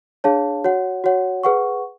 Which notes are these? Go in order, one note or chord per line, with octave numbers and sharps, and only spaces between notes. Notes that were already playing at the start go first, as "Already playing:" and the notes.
D4 G#4 C#5 F5 A5
F#4 C#5 F#5
F#4 C#5 F#5
G#4 B4 F#5 C#6